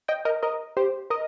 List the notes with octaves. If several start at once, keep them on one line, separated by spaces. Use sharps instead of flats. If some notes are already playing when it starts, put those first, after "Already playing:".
D#5 G5
A#4 D#5
A#4 D#5
G4 C5
A#4 D#5